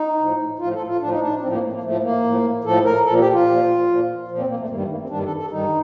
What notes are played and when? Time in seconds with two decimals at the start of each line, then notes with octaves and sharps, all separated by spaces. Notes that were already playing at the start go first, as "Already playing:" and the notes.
Already playing: D#4
0.19 A2 F3
0.59 A2 F3 F4
0.73 A4
0.88 F4
1.00 A2 F3 D4
1.10 D#4
1.20 D4
1.41 A2 F3 C4
1.52 A#3
1.73 A#3
1.83 A2 F3 A3
2.03 A#3
2.24 A2 F3
2.64 A2 F3 A4
2.85 A#4
3.05 A#2 F3 A4
3.19 G4
3.33 F4
3.46 A#2 F3
3.87 A#2 F3
4.28 A#2 F3
4.38 C4
4.48 A#3
4.59 A3
4.69 G2 D#3 G3 A#3
4.79 A3
4.89 A#3
5.00 C4
5.09 G2 D#3 G3 D4
5.19 G4
5.23 A4
5.37 A4
5.50 G2 D#3 G3 D#4